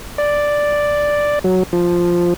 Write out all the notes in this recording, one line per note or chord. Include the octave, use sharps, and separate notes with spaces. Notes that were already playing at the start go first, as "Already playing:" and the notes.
D5
F#3
F3